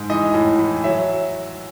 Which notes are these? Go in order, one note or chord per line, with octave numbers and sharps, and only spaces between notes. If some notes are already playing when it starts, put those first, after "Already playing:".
Already playing: G#2
E3 D#5
A2
E3
F#3 E5